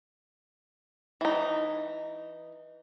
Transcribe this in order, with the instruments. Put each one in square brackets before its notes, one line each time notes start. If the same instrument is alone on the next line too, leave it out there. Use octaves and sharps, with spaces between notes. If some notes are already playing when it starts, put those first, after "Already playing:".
[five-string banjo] E3 D#4